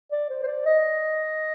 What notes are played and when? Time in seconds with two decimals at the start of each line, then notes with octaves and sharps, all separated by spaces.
0.12 D5
0.30 C5
0.43 C5
0.47 D5
0.65 D#5